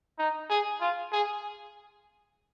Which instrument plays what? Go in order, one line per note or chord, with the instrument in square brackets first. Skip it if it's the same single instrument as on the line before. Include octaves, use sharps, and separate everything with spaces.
[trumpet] D#4
G#4
F4
G#4